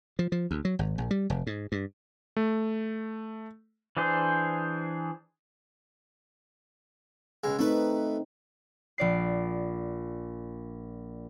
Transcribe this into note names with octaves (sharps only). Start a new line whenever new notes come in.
F3
F3
D2
F#3
G#1
A#1
G3
F1
G#2
G2
A3
E3 D4 G#4 C5
C#2 G#3
A3 C4 D#4 B4
A#1 D5 C7